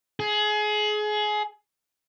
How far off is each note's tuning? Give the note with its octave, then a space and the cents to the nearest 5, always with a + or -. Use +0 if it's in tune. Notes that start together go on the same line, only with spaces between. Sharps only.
G#4 +25